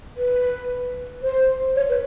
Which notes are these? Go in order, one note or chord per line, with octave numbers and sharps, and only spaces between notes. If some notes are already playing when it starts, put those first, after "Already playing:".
B4
C5
C#5
B4